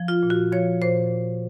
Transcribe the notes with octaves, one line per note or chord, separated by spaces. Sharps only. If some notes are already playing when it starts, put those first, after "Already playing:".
Already playing: F3
F4
A#2
F#4
F3 C#5
A#2 C5